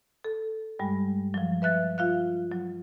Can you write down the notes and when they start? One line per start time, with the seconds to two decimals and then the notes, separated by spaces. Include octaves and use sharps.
0.24 A4
0.79 G2 G3 G#3
1.34 F3 F#3
1.62 B4 E5 F#6 A6
1.98 F4 F5 F#6
2.51 F#3